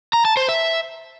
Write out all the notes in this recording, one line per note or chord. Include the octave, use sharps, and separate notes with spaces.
A#5
A5
C5
E5